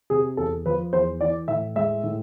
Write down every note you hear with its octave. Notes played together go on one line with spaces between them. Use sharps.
C3 G#4
E2 A4
F3 B4
E2 C5
E3 D5
A2 E5
G#3 E5
A2